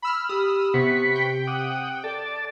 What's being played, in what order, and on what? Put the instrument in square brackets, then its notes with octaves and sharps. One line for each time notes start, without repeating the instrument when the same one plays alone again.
[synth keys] B5 E6 F6
[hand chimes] G4 [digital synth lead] D#6
[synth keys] C3 [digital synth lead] B3 [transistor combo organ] B4 B5 C#6
[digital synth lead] G5
[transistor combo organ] F#5 D#6 [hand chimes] D6
[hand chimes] A4 [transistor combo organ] D5 A5